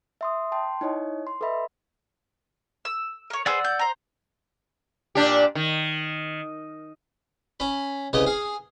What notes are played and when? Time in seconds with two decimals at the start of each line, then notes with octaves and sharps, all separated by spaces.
0.21 E5 C6 D#6
0.52 G5 A5 C6
0.81 D#4 E4 C#5 D#5
1.27 C6
1.41 A4 B4 D#5 E5 B5
2.85 E6
3.30 A#4 C#5
3.46 G#4 B4 C5 D5 F#5 E6
3.65 G6
3.79 C5 A#5
5.15 A#2 D4 G4
5.55 D#3
7.60 C#4 B5
8.13 C2 C#3 B4 D#5
8.26 G#4 F5